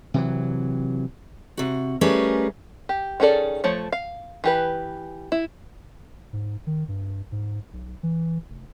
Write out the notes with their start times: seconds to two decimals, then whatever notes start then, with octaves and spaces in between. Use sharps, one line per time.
0.14 C3 E3 F#3
1.57 C3 F#4
2.01 G3 A3 C#4 G#4 A#4 B4
2.89 G4
3.20 D#3 C#4 G#4 A4 D5
3.64 F3 A3 C#5
3.92 F5
4.44 E3 G4 B4
5.32 E4
6.33 G#2
6.67 D#3
6.88 G2
7.32 G#2
7.73 B1
8.03 E3
8.50 F1